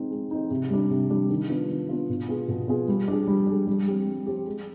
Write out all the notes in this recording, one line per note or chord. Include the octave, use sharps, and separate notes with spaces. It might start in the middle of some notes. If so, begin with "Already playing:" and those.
Already playing: G#3 C4 D#4
G#3
C4 D#4
C3
G3 D4
C3
G3 D4
D#3
B3 D4 F4
D#3
B3 D4 F4
B2
B3 F4 G#4
B2
B3 F4 G#4
G3
D4 G#4
G3
D4 G#4
G3
C4 G4
G3
C4 G4
G#3